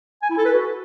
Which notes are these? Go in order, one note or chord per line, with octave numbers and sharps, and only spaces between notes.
G#5
E4
A4
B4
F#4